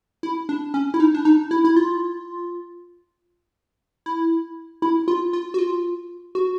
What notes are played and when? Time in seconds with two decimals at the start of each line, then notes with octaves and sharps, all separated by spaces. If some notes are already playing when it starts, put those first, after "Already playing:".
0.23 E4
0.49 D4
0.74 C#4
0.94 E4
1.00 D#4
1.14 D4
1.25 D#4
1.51 E4
1.64 E4
1.76 F4
4.06 E4
4.82 E4
5.08 F4
5.33 F4
5.54 F#4
5.59 F4
6.35 F#4